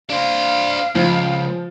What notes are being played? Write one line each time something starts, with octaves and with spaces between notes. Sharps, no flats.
D4 C5 F5
C#2 F3